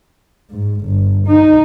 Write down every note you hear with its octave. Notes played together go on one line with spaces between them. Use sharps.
G#2
G1
D#4